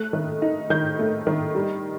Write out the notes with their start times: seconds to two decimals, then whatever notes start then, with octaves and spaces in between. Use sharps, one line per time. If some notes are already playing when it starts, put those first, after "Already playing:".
Already playing: A3 F#6
0.13 D#3
0.42 D#4
0.70 D#3 G6
0.99 A3
1.27 D#3
1.55 G3